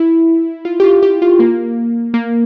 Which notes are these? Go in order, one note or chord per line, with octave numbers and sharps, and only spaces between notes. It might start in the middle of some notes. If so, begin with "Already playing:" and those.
Already playing: E4
F4
G4
F4
G4
F4
A#3
A#3